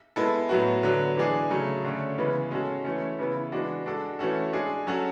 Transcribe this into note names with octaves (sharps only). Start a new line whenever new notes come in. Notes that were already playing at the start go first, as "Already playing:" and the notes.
G#3 B3 E4 A4
A2 F#3 B3 F#4
D3 F#3 B3
E3 G#3 D4 G#4
C#3 F#3 A3
D3 A3 C#4
C#3 E3 G#3 B3
G#3 C#4 F#4 A4
E3 A3 C#4
C#3 E3 B3 E4
E3 G#3 D4 F#4
G#3 D4 F#4 A4
E3 A3 C#4 F#4 A4
G#3 D4 G#4
F#3 C#4 F#4 A4